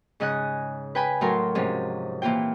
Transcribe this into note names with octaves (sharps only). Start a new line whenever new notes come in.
G#2 C#3 D#5 G#5 F#6
B4 G5 G#5 B5
A2 F#3 A#4 C6
G#2 C3 F3 C#4
A#2 E3 A#3 F4 G5